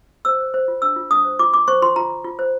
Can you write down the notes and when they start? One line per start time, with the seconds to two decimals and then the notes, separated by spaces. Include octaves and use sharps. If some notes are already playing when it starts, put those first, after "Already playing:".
0.25 C5 E6
0.40 C5
0.54 C5
0.68 F4
0.82 D4 E6
0.96 F4
1.10 D4 D#6
1.24 C5
1.39 F4 D6
1.53 F4 D6
1.68 C5 C#6
1.82 F4 C6
1.96 F4 A#5
2.10 F4
2.25 F4
2.39 C5